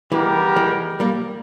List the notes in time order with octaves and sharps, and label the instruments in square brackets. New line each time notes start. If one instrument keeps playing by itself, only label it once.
[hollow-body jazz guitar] E3 G#3 [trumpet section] G3 B3 G4 A#4
[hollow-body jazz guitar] E3 G#3
G3 A#3